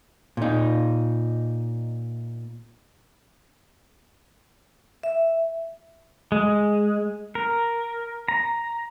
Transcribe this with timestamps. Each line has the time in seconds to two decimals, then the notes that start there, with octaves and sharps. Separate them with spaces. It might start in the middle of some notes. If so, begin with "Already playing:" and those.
0.37 A#2 D#4
5.03 E5
6.32 G#3
7.35 A#4
8.28 A#5